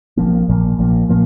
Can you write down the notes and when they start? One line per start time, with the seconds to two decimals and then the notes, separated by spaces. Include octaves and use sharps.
0.17 A#1 A#2 F3 A#3
0.48 A#1 A#2 F3 A#3
0.79 A#1 A#2 F3 A#3
1.09 A#2 F3 A#3